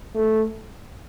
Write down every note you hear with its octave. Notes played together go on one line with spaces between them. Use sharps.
A3